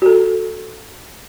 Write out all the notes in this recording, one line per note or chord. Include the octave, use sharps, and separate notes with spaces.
F#4 A4